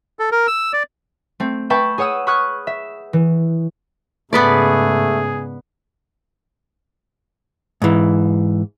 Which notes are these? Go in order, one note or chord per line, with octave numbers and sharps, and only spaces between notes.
A4
A#4
E6
D5
A3 C4
B4 E5 G5 A5 B5 C#6
G#4 C#5 F#5 D#6 E6
B5 C#6 D#6 F6 F#6 G#6
E5
E3
G#2 C#3 A3 B3 G#4 B4 D5
G#2 E3